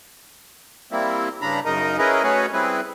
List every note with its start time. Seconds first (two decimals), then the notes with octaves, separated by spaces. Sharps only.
0.92 G3 A#3 C4 E4
1.42 G2 C#3 D4 A#5 B5
1.65 F#2 C#3 D#4 A#4 D#5
1.98 C#4 E4 G#4 A#4 B4 D#5
2.23 A3 C#4 F#4 G#4 B4 C#5
2.53 G3 C4 E4 G#4 B4